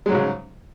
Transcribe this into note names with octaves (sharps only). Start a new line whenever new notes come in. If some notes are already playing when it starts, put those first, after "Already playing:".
G#2 C#3 F#3 G#3